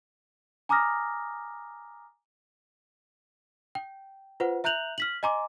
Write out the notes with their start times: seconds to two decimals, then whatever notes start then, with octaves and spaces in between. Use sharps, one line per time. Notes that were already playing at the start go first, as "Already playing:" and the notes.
0.69 G#5 A#5 D6 D#6 F6 A#6
3.75 G5
4.40 F4 B4 C5 F#5
4.64 E5 A#5 F#6 G6 F7 F#7
4.98 F6 B6 F#7
5.23 D#5 G#5 A#5 C6 D6